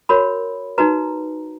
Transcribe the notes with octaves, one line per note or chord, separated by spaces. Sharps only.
F#4 A#4 C#5 B5
D#4 F#4 B4 A#5